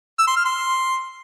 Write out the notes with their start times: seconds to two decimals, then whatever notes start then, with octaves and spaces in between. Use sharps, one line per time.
0.19 E6
0.27 C6
0.36 F6
0.45 C6